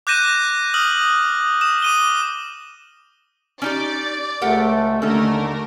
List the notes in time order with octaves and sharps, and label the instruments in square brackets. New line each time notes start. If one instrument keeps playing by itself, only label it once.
[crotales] D6 F#6 G6 A#6 D#7 E7
D#6 F6 F#7
D#6 E7
D6 D#7 G7
[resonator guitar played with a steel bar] C#4 D#4 G4 [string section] D5
[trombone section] C#2 A3 [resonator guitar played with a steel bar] G4 A#4 F#5
[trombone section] D#2 D3 [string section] A3 A#4 [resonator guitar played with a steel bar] C#4 A4